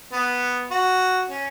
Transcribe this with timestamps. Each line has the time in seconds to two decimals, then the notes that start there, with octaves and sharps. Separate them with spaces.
0.12 B3
0.71 F#4
1.30 C#4